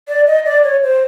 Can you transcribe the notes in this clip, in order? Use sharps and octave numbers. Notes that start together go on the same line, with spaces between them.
D5
D#5
D5
C#5
C5